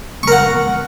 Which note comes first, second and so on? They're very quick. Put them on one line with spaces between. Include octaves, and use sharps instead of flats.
C#6 A#4 F#5